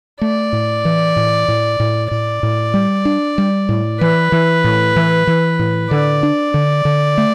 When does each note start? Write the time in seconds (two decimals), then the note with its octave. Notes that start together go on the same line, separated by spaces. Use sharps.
0.21 A3 D5
0.53 A2
0.85 E3
1.16 A2
1.48 A2
1.80 A2
2.11 A2 D5
2.43 A2
2.74 G3
3.05 D4
3.38 G3
3.69 A2
4.01 E3 B4
4.32 E3
4.64 A2
4.96 E3
5.27 E3
5.59 A2
5.91 D3 D5
6.23 D4
6.54 D3
6.85 D3
7.18 A3